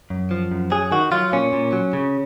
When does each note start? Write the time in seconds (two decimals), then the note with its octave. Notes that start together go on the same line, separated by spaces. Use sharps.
0.10 F#2
0.31 F3
0.52 F#2
0.71 F#3 G#4
0.92 D#3 F#4
1.12 F#3 F4
1.32 A#2 C#4
1.53 A#2
1.73 F#3
1.93 C#3